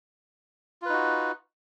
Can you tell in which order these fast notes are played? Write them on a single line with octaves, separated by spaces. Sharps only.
F4 B4 D#4 F#4